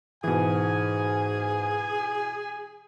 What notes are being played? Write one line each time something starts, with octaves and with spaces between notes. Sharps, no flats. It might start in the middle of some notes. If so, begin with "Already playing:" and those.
G#2 B2 E3 G#4 G#5